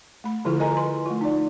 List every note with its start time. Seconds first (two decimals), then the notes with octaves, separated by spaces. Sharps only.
0.24 A3 B5
0.45 D3 F3 E4 F4 G#4 A4
0.59 A#4 D#5 G#5 A#5
0.77 B4 C6
1.06 A3 F4
1.21 D#4 D5